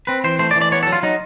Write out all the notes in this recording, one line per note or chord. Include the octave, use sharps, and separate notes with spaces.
C4 B4
E3 C5
A3 C5
D5
E3
D5
B3 C#5
A4
F#3
F4
F#3 D#4